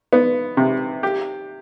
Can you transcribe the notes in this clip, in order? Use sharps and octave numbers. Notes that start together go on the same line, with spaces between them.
B3
C3
G4